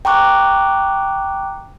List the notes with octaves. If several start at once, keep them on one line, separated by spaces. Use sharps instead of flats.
G5 A#5 C#6 D6 F#6